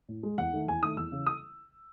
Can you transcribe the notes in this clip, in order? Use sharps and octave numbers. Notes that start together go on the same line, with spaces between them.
A2
G#3
E2 F#5
D#3 A3
E2 G#5
D#3 A3 D#6
E2 E6
C#3 E3
D#6